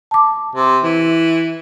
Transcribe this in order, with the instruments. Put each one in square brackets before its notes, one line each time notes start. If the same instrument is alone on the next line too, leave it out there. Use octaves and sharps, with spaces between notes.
[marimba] A5 D6
[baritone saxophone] C3
E3